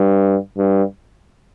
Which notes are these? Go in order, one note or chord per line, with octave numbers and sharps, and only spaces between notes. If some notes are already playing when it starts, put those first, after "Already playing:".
Already playing: G2
G2